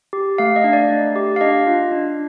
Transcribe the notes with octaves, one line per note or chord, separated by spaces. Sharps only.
G4
A3 F5
D#5
D4
D5
A3
G4
F5
D4 D#5
F4
D4